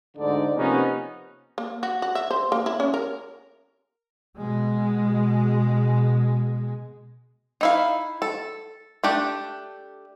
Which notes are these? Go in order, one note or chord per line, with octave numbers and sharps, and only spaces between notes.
D2 G#2 D3 D#4 D5
C3 F3 A#3 B3 C#4 D#4
A#3
F#4
F#4
E5
C5
A#3
E4
C#4
A#4
B2 G#3
D#4 E4 F5
A4
A3 D4 G4